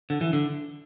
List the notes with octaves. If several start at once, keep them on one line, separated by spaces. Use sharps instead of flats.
D3
E3
D3